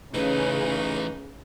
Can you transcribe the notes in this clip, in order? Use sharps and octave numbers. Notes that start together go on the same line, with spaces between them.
C#3 E3 A3 D#4 B4